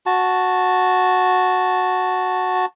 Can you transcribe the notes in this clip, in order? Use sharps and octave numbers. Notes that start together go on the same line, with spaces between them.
F#4 A5